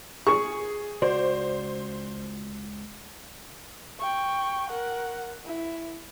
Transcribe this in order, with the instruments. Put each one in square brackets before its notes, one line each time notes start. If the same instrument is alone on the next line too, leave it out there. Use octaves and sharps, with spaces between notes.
[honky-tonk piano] G#4 [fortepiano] C#6
[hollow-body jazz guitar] C#2 F#4 D5 [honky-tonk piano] C5
[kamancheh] G5 C#6
A#4 F#5
E4